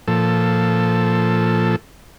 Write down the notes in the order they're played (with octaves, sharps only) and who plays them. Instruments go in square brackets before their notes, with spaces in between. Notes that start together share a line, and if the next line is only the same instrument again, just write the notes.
[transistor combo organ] A#2 F3 A4